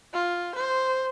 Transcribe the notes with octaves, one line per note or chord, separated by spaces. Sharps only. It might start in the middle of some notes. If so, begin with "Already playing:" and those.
F4
C5